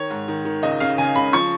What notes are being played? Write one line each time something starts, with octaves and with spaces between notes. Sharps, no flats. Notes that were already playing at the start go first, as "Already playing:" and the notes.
Already playing: D#3 C#5
G#2
D#3
D#3
C#2 D#5
C#3 F5
C#3 G#5
C#2 B5
F3 C#6